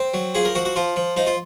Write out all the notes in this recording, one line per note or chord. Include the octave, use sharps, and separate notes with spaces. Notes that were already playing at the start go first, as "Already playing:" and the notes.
Already playing: C4
F#3
F3 G#4
A#4
F3 F#4
F#4
F3 F4
F3
F3 D#4
F4